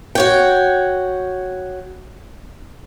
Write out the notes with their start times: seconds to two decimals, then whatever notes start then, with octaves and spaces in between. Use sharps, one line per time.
0.15 F#4 C#5 G5